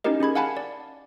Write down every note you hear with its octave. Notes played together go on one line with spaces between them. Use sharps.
C#4 D#4 E4 G4 A#4 D#5
C#4 G#4 B5 G#6
F5 F#5 G#5 A5 B5
D5